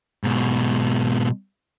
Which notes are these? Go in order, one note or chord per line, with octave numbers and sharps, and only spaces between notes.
G#2 B2